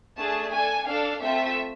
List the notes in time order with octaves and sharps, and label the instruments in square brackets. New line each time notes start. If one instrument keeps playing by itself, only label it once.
[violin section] A3 D4 G#4 A5
D4 A4 G#5
D4 A4 F5
A3 C4 F4 A4 E5